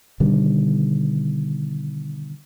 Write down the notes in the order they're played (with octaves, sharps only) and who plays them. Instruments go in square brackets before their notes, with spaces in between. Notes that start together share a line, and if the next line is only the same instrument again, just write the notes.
[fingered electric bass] B2 D3 D#3 G3